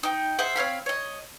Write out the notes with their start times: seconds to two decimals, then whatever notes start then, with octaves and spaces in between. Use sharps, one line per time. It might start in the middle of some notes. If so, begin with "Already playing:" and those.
0.03 D#4 G5
0.38 G#4 C5 E5 F#5
0.56 C4 C#5 F5 B5
0.86 C#5 D#5